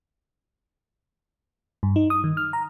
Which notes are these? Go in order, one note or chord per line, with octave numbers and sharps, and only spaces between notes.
G2
D#4
D#6
D#3
F6
A#5